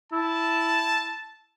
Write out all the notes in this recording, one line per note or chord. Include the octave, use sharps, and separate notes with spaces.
E4 A5